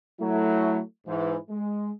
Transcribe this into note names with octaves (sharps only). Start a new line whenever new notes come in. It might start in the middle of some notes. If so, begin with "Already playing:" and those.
F#3 A3 E4
G#2 E3
G#3